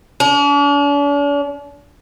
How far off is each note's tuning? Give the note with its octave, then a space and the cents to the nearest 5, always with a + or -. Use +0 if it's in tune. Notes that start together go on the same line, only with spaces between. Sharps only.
D4 -45